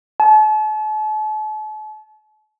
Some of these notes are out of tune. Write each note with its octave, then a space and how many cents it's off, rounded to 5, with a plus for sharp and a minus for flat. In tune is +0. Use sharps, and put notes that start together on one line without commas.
A5 -40